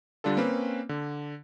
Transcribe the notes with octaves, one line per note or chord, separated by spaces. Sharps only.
D3 G3 D4 F4 A4
A#3 C4 C#4 B4
D3